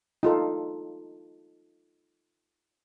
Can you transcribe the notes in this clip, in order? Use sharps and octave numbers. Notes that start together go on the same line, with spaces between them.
D#4 F4 A4